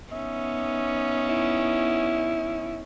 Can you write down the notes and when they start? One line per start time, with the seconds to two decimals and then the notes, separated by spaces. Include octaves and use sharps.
0.12 B3 C#4 D#4 E5
1.29 E4